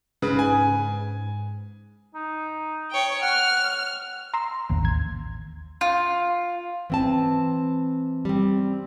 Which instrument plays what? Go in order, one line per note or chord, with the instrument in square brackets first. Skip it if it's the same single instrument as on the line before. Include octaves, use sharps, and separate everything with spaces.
[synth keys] G#2 [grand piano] C#3 B4
[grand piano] G#5
[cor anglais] D#4
[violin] C#5 G5
[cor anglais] F#5 [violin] F6
[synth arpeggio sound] A#5 C6 E6
A1 D#2
G#6
[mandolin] F4
[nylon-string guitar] E3 C4 A5
G3 C4